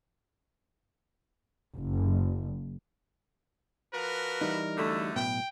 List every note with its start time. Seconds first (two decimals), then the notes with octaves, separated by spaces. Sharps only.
1.77 F#1
3.93 F3 F#4 A#4 B4
4.41 E3 G3 D#4
4.77 F#2 D3 A3
5.16 B1 A2 B3 G5